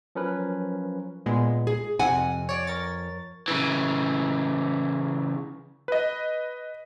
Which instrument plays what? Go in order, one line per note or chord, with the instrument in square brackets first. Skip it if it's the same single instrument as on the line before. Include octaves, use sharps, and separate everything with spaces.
[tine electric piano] F3 F#3 C#4 A#4 B4
[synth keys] A#2 G#3 B3
[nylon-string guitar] G#4
[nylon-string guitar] F2 F#5 G#5 [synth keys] C3
[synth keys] C#5 D5
A#4 C#5 A6
[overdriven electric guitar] C#3 E3
[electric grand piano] B4 D#5